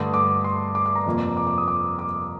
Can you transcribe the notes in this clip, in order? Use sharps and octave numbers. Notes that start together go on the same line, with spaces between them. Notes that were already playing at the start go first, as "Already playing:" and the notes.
Already playing: G2 D3 A3 D#6
D6
C6
D6
D6
A#5
F2 C3 F3 A#3
D6
D6
D#6
D6
D6